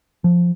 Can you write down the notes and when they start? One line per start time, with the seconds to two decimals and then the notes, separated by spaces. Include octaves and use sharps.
0.24 F3